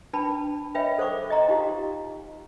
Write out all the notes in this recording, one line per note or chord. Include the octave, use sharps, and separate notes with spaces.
D4 B4 G5 A5 B5
B4 C#5 D#5 E5 G5 B5
A4 C5 F#5 C#6 D6
D#5 G5 A#5 C6
D#4 F4 G4 F5